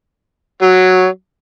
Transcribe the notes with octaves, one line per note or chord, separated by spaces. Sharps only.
F#3